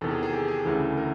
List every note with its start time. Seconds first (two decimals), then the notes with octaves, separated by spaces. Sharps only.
0.01 E2 C3 D#3 A4
0.11 G#4
0.23 G#4
0.33 G4
0.48 G#4
0.65 D2 C#3 E3 A4
0.97 A#4